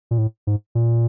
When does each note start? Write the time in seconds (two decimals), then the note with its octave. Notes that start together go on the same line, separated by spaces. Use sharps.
0.11 A#2
0.18 A2
0.47 G#2
0.75 A#2